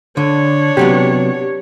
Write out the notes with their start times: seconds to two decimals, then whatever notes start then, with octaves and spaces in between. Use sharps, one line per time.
0.17 D3 D4 C#5
0.77 C3 F#3 B3 G4